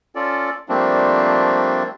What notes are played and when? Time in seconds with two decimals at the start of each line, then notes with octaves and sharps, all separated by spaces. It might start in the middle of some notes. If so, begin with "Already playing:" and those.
0.15 C#4 F4 A4 D5
0.69 F3 G3 A3 A#3 C4 D4